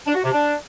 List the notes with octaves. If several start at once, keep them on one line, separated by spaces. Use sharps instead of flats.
D4
F#4
C3
D4